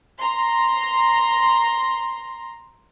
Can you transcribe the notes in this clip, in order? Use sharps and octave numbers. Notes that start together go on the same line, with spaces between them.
A#5 C6